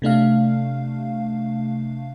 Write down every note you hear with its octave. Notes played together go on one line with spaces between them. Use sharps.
C3 A3 D4 F5